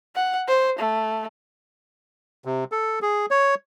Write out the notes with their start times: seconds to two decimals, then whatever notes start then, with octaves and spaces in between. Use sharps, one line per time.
0.15 F#5
0.48 C5
0.79 A3
2.45 C3
2.72 A4
3.02 G#4
3.31 C#5